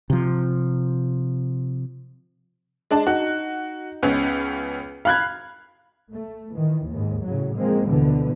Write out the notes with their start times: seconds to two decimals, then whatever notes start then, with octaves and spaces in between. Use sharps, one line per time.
0.10 C3 F3
2.91 G#3 D4 A5
3.07 D#4 F#4
4.03 C#2 B3 C#4
5.05 F5 B5 F#6 G#6
6.12 A3
6.54 D#3 E3
6.89 D#2 G#2
7.26 A2 C#3 F#3
7.56 F3 G#3 A#3 C4
7.88 D2 B2 D3 E3 F3 B3